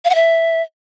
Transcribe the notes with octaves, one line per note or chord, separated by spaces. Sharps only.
F5
F#5
E5